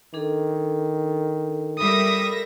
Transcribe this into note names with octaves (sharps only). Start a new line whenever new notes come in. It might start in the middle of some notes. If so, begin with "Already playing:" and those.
D#3 D4 G#4 A4
G3 A4 A#4 E5 B5 D#6 A#6